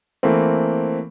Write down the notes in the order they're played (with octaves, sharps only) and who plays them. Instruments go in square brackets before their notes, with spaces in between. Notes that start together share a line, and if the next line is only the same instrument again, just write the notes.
[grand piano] E3 A3 A#3 C4